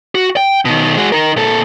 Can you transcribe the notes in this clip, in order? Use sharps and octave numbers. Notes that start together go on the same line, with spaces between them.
F#4
G5
B2 D#3
G#3 F#4
D#4 A#4
A#2 A4